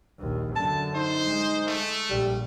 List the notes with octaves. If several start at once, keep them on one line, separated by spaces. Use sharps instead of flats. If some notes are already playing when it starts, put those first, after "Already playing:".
A#1 D#2
F#2 D3 A5
D#4 C5
G#3
A3
A#1 G3